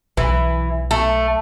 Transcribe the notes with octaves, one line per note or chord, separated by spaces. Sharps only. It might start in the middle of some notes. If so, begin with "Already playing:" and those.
B1 E3
A3